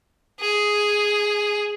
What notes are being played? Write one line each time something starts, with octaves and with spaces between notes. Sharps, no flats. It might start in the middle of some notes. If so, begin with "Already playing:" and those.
G#4